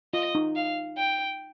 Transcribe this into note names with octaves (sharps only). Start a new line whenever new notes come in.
F4 D#5
D#4
F5
G5